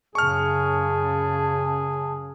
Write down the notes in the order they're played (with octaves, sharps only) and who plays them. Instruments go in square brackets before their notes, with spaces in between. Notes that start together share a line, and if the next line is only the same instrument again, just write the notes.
[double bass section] F#2 C#3 [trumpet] G#4 [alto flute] A5 [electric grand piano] C#6 F6